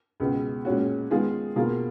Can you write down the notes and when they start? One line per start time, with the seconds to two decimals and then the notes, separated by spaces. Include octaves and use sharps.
0.20 C#2 B2 G#3 B3
0.65 A#2 G#3 C#4 F#4
1.11 D#3 G#3 B3 F4 G#4
1.56 B2 A#3 F4 G#4